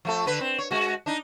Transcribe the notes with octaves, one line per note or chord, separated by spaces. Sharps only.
F3 A3 A4
D3 B4
C4
C#5
G#3 F#4
D4 D#4